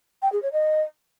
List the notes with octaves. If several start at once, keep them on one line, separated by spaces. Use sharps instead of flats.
G5
G#4
C#5
D#5